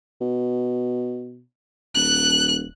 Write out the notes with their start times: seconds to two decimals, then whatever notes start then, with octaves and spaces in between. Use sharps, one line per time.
0.21 B2
1.95 D#1 F#6